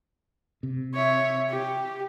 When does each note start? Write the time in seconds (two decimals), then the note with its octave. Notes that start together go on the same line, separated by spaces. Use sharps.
0.63 C3
0.94 C#5 E5
1.50 G4